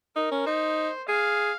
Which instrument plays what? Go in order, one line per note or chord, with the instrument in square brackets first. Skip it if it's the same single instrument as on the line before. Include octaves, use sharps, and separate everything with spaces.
[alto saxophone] D#4 [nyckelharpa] A#4
[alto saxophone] C#4
[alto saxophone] D#4 [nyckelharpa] C5
[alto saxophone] G#4 [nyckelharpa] F5